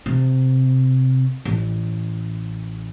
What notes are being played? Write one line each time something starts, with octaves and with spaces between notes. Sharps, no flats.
C3
A1